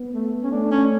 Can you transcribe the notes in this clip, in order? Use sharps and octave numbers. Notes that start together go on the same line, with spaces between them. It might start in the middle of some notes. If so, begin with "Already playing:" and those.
Already playing: B3
A3
C#4
A3 D4
C#4